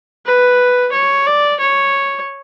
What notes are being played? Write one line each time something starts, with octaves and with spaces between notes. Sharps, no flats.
B4
C#5
D5
C#5